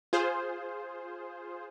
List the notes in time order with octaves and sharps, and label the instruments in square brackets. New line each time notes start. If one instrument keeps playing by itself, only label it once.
[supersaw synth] F4 G#4 C5